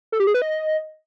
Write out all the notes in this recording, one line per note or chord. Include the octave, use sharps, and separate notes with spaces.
A4
G4
G#4
B4
D#5